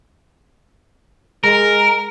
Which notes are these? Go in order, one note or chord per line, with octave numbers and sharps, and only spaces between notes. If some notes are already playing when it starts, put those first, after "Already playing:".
G#3 A#4